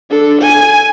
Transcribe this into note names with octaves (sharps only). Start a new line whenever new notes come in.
D4 A4
G#5